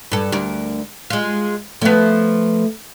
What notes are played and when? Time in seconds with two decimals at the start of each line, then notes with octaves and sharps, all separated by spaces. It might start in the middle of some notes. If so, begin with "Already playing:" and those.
0.12 G2 A4
0.32 D2 A#4
1.10 G#3 F4
1.82 F3 A3 B3